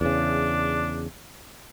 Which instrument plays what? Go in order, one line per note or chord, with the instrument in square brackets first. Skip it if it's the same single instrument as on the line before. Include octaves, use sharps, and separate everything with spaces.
[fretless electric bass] E2 C#3 [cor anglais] D4